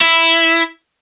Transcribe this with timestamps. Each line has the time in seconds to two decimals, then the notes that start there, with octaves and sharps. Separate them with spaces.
0.01 E4